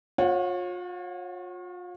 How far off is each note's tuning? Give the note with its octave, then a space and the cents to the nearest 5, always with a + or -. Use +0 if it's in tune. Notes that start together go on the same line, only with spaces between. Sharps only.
F4 +35 C#5 -30 F#5 +0